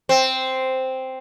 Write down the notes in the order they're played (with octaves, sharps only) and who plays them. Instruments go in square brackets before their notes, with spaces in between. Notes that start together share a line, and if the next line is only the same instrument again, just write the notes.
[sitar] C4